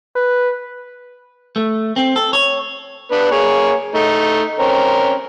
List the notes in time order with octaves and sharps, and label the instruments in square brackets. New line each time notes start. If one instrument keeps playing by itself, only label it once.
[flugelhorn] B4
[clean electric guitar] A3
C4
A4
C#5
[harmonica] B3 D4 B4
A#3 G#4 C#5
A3 D#4
C4 C#4 A#4